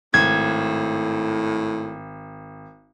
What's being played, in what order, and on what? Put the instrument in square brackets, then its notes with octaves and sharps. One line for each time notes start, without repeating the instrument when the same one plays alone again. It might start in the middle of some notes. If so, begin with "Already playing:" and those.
[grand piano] G#1 [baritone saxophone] A2 [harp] G#6